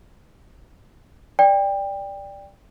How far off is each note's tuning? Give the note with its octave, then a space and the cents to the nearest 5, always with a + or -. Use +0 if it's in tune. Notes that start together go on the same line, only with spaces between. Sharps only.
D5 +0 G5 +20